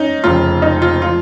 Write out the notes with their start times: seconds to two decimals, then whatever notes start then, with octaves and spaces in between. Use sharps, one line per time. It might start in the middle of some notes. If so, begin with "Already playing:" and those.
Already playing: C#4 D#4
0.24 F1 F2 C#3 F4
0.62 D#4
0.82 F4
1.02 F4
1.06 F3